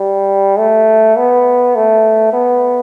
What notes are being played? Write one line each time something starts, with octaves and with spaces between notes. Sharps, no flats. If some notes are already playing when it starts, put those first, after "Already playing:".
Already playing: G3
A3
B3
A3
B3